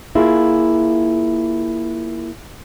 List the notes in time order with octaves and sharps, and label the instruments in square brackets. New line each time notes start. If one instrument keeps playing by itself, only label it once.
[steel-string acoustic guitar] A#3 E4 F4 G#4